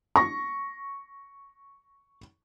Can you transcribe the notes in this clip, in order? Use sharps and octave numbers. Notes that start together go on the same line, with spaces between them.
C#6 A#6